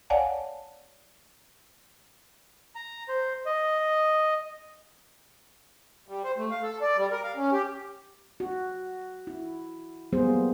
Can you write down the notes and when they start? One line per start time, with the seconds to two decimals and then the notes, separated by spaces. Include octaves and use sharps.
0.10 C#5 D5 F5 F#5 G#5 A5
2.75 A#5
3.09 C5
3.46 D#5
6.09 G3
6.24 C5
6.37 A3
6.51 F5
6.63 A4
6.81 D5
6.97 G3
7.11 A#4
7.23 F5
7.36 C#4
7.52 G4
8.40 F#4
9.27 E4
10.13 F#3 G3 A#3 B3 G#4 C5